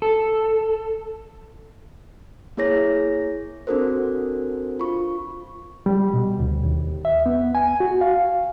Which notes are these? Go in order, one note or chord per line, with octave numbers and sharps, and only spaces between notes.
A4
A#3 E4 G#4 C#5 A#6
C4 D4 F#4 A4 A#4 C5
F4 C#6
G3
B2
D2
D#2
E5
B3
G#5
F#4
F5